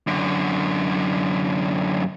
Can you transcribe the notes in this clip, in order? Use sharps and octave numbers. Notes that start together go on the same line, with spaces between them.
F#2 D3